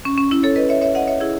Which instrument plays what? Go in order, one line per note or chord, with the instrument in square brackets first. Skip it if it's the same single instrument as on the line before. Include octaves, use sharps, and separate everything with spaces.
[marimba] C#4
C#4
C#4 E4
A4 C#5
B4 D#5
C#5 E5
C#5 E5
D#5 F#5
C#5 E5
E4 G#4